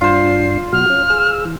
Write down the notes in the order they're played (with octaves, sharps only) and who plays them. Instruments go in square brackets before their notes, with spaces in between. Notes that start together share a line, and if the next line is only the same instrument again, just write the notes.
[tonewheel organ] G2 D4 [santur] F4 C5 [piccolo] C7
[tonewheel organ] B2 F#3 F#4 [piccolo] F6
[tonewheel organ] C#4
G#4 E6
E3